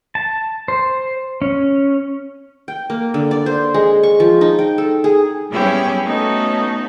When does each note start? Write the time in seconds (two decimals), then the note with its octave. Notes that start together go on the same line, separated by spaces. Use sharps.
0.15 A5
0.68 C5
1.42 C#4
2.68 G5
2.90 A#3
3.14 D3
3.31 D5
3.46 C5
3.74 G#3
4.03 C#6
4.20 F3
4.41 D#4
4.59 G5
4.78 A4
5.04 G#4
5.50 G3 B3 C#4 E4 G4 G#4
6.05 A3 B3 C#4 D#4 F#4 A4